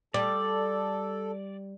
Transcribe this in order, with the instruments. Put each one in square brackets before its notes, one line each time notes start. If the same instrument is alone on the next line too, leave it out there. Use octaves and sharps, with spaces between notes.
[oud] G3 [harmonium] A4 [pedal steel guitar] D5